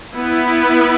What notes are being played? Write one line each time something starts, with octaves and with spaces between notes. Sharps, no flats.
B3 E4 B4